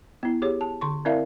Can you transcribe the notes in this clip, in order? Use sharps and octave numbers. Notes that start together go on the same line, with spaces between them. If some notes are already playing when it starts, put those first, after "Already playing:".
B3 E4
G4 G#4 C#5
A5
D3 C6 C#6
C4 E4 A#4 D5 E5 F5